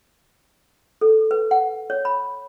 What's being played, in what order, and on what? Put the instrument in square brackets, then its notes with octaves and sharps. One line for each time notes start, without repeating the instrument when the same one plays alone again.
[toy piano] A4
B4
F#5
C#5
B5